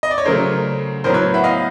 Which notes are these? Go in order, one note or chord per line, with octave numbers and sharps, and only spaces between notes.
D#5
D5
C#5
C#3 F#3 A3 A#4 C5
A2 F#3 B3 A#4 C5
B4 C#5
E5 F#5
D#5 F5